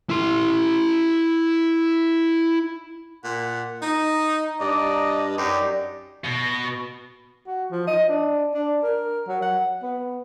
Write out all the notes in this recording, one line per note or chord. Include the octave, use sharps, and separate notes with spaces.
E4 C6
A#2 F#5
D#4 D#5 A#5
G2 D5 D#5
F#2 D#4 G4 D5
B2
F#4
F3
D#5
D4
D4
A#4
F#3
F#5
B3